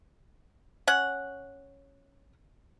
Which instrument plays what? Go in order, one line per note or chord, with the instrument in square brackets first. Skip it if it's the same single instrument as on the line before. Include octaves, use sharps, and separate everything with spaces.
[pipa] C#4 F#5